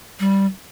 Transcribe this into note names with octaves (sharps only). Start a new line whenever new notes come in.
G3